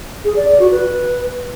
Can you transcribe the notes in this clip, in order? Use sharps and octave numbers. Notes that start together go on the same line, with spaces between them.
G#4
D5
D5
F#4
B4